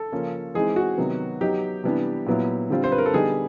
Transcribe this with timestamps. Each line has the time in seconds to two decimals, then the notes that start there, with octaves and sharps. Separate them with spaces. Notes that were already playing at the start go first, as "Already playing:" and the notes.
Already playing: A4
0.12 C#3 F3 A#3 C#4
0.54 E3 G#3 C4 D#4 G#4
0.76 F#4
0.98 C3 D#3 F#3 B3
1.41 F#3 B3 D#4 G4
1.84 C3 E3 G3 B3 D4
2.27 A#2 F#3 B3 E4
2.70 D3 G3 C4 F4
2.84 C5
2.92 B4
2.98 A#4
3.06 A4
3.14 D3 G3 B3 D#4 G#4